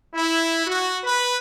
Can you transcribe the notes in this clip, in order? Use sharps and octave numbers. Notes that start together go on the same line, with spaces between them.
E4
F#4
B4